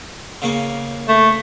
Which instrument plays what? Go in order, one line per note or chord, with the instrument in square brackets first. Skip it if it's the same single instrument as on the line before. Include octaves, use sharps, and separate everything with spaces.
[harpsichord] C#3 A#3 C#6
[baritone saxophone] A3